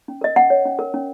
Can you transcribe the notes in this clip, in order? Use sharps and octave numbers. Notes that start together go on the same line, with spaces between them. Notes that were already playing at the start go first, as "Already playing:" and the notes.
C#4
A#4 D#5
C#4 F#5
C#5
C#4
A#4
C#4